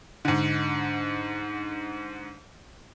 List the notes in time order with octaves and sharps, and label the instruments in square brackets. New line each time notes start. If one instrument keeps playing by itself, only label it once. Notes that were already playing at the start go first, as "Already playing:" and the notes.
[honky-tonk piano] G#2 D3